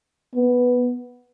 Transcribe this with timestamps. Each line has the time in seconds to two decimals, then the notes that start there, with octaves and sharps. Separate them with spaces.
0.35 B3